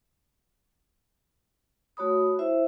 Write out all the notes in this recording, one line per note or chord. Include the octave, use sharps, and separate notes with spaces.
A3 F#4 C#5 B5 D#6
E4 C5 E5